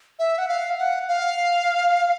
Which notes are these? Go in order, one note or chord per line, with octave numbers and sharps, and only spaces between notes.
E5
F#5
F5
F#5
F5